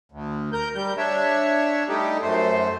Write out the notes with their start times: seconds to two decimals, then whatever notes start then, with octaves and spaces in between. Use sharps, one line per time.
0.12 D2
0.53 A#4 G6
0.75 G3 G6
0.98 D4 C#5 E5
1.88 G3 A3 D#4 G4
2.22 F#2 A3 C5